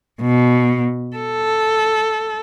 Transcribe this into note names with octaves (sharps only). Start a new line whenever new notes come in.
B2
A4